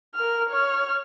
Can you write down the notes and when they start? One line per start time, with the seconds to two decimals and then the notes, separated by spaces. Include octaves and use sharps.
0.15 A#4 F6
0.49 C#5 F6